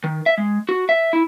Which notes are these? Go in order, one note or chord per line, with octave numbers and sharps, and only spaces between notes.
D#3
E5
G#3
F#4
E5
E4